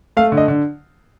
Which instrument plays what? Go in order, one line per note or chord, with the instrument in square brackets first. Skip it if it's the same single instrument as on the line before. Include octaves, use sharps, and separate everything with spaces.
[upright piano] A3 F5
D3
D#5
D3